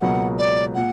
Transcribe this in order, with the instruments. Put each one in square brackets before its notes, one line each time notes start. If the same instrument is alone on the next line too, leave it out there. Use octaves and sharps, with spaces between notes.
[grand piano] C#2 B2 F#3 A#3 [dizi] F#5
[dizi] D5
[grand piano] A#2 [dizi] F#5